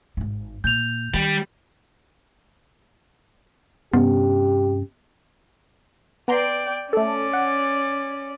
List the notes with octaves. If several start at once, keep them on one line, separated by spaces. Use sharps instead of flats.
G#1 G#2
A#2 G6 F7
D#3 G3
G2 C3 B3 C#4 G4
B3 D5 G5 A#5 C6
A3 C#4 A4 D5
F#5